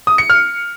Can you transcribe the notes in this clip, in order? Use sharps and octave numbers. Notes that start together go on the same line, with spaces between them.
D#6
C#7
F6